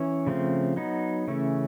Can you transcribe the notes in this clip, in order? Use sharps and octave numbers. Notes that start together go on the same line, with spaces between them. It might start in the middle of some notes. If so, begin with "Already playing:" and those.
Already playing: E3 C#4
C#3 F3 A3 C4
F#3 B3 D#4
C#3 E3 A3 C#4